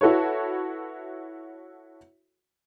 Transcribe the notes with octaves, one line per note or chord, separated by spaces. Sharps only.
E4 F#4 A4 B4 C#5